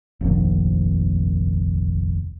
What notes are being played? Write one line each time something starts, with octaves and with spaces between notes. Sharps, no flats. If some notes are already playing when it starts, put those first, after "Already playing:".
F1 A#1 D#2